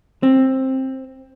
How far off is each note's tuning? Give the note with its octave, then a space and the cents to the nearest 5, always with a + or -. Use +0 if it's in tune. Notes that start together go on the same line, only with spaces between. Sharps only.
C4 +15